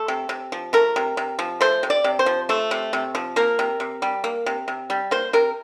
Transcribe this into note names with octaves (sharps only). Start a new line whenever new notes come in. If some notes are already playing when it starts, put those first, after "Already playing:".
Already playing: A3 A4
C3
C3
F3
A3 A#4
C3
C3
F3
A3 C5
C3
D5
C3
C5
F3
A3 C5
C3
C3
F3
A#3 A#4
C3
C3
G3
A#3
C3
C3
G3
A#3 C5
C3 A#4